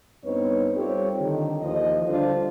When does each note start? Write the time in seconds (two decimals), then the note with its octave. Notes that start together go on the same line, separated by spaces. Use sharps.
0.25 G2 B3 C4 D#4 B4 C#5
0.76 G3 C4 F4 G4 A4 C#5
1.20 D3 D#3
1.61 D#2 E3 F3 D#5
2.07 D3 G3 D4 F4 A4 C5